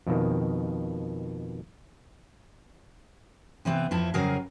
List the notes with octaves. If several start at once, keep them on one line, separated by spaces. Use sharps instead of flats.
F2 B2 D#3
C3 E3 B3 C4
F2 F3 E4 A5
F2 C#3 F#3 G#4 A#4 F5